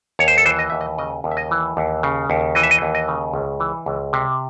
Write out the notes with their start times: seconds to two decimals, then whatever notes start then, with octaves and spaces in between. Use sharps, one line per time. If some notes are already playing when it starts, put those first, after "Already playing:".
0.19 D#2 C#5
0.28 C5
0.38 A4
0.45 E3 C5
0.59 D#5
0.70 D#2 E5
0.81 D#5
0.98 C#3 D#5
1.24 D#2
1.31 E5
1.37 D#5
1.51 E3
1.77 D#2
2.03 C#3
2.30 D#2
2.55 E3 D#5
2.63 E5
2.71 D#5
2.82 D#2
2.95 D#5
3.08 C#3
3.34 C#2
3.60 E3
3.86 C#2
4.13 C3